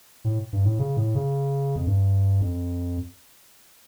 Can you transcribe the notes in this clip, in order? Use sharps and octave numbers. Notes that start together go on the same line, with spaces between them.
A2
G2
A2
C#3
A2
C#3
F2
G2
F2